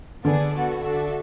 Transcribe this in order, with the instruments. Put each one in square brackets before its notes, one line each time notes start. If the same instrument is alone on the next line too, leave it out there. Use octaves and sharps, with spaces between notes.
[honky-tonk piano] D3 [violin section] B3 D4 G#4 D5
[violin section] B3 F#4 A4
D4 F#4 A4 E5